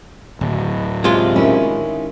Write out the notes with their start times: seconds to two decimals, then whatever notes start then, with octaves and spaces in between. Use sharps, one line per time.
0.41 D1
1.04 C3 G#3 F4
1.36 D#3 C#4 E4